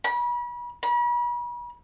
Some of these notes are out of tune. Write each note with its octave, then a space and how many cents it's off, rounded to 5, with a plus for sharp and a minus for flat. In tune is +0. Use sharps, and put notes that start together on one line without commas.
B5 -35
B5 -40